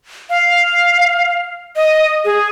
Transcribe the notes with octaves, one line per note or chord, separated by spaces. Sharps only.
F5
D#5
G#4